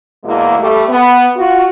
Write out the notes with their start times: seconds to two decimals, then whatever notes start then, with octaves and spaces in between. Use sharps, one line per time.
0.24 E2 B2 G#3 A#3 E4
0.58 G3 A3
0.89 B3
1.35 F4 F#4